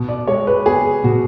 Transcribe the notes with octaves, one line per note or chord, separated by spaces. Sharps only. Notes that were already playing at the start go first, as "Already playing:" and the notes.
Already playing: B2
D5
G#3 C#5
B4
B3 G#4
B2 F#4